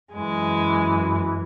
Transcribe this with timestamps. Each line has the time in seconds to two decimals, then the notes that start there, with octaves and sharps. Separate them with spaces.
0.13 F#2 E3 G#3